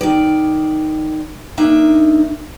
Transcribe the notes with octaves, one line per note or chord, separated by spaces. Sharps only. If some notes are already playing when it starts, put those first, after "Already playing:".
D#3 D5
A#3 D4 D#4 E5